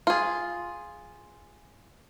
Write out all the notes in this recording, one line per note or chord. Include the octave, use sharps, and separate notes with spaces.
F4 G#4